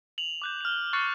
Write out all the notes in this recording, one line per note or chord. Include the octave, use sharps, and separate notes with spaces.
F7 F#7
D6 F#6 G6
F6 F7
C#6 F6 F#6 A6 C7 C#7